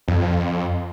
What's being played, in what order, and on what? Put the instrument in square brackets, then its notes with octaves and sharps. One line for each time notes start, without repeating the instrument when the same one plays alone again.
[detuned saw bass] F2